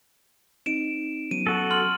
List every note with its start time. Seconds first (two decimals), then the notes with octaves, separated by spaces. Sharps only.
0.66 C4 D#4 D7 E7
1.31 F#3 B3 C#4 D#7
1.47 F#4 A4
1.71 C6 F6 F#7